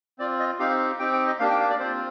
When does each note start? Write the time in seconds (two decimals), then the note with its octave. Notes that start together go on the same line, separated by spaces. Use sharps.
0.19 C4 F4 D5
0.39 D#5
0.59 C4 D#4 G4 F5
0.99 C4 D#4 G4 G5
1.13 G5
1.27 D#5
1.39 A#3 D4 G4 F5
1.50 G5
1.60 F5
1.70 D5
1.80 C4 F4 C5